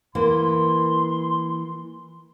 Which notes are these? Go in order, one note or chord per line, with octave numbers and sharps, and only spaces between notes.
E3 A#3 C6